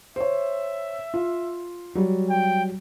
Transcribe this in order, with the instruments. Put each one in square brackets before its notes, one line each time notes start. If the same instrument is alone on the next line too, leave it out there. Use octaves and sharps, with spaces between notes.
[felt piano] C5 C#5 [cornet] E5
[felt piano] F4
F#3 G3
[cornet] G5